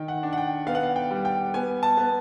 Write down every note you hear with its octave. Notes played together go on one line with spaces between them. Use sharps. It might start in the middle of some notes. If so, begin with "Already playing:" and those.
Already playing: D#3 G5
F#5
D4
F#5
G5
B3 F5
F#5
F5
G5
G3
G5
B3 G#5
A5
B3